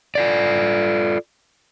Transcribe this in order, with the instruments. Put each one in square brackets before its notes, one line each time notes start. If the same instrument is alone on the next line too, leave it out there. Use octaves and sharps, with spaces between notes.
[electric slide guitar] F4 A4 D5